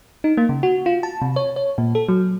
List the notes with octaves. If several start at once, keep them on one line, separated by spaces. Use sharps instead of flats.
D#4
A#3
C#3
F#4
F4
A5
C3
C#5
C#5
A#2
A4
F#3